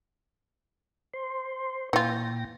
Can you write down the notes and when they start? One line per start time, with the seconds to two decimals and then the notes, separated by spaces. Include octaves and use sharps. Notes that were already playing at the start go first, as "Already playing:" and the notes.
1.13 C5 C6
1.93 A#2 E3 F4 G5 A#6